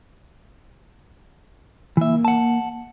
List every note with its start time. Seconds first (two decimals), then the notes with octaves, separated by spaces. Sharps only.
1.97 E3 A#3 E5
2.25 F#5 A5